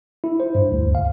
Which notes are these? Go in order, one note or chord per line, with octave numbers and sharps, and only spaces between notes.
E4
C5
G2
D2
C#2
F5